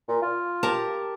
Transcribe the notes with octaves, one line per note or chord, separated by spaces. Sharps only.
A#2
F4
G4 A#4 A5